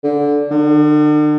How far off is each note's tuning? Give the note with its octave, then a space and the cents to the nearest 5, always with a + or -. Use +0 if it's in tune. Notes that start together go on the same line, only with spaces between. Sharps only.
D3 -15
D3 +40